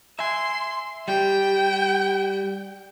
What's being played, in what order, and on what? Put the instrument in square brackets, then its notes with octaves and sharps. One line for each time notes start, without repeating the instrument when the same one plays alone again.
[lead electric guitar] E5 G#5 [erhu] C6
[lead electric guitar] G3 G4 [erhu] G5